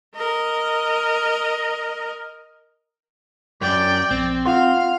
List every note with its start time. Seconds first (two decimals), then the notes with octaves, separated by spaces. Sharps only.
0.16 A#4 D#5
3.62 F#2 D5 G5
4.11 A#1 C4
4.46 F4 F5 F#5 C6